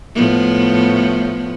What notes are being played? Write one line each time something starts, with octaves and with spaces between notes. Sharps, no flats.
A2 F3 B3